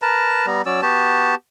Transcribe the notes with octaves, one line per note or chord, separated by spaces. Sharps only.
A#4 B4 A5 A#5
G3 B3 A#5
F#3 C#4 D5 E6
B3 F#4 G4 A5